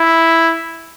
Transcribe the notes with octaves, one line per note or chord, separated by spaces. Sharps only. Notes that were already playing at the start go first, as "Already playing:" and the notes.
Already playing: E4